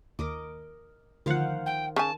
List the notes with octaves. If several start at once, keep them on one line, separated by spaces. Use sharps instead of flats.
D#2 A#4 D#5 D6
D2 D#3 F3 C5 F5 F#5
G5
C#3 G#5 A5